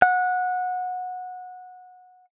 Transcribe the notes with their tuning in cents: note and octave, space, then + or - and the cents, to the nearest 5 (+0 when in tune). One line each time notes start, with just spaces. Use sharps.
F#5 -20